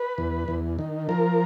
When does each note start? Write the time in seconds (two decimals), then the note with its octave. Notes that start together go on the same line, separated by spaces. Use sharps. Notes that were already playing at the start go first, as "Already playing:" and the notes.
Already playing: B4
0.18 E2
0.48 E2
0.79 D#3
1.09 F3 A#4